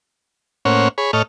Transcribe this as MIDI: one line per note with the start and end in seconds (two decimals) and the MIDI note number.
0.65 0.88 45
0.65 0.88 58
0.65 0.88 61
0.65 0.88 72
0.65 0.88 73
0.65 0.88 78
0.98 1.11 68
0.98 1.11 73
0.98 1.11 83
1.13 1.22 45
1.13 1.22 69
1.13 1.22 73
1.13 1.22 75
1.13 1.22 89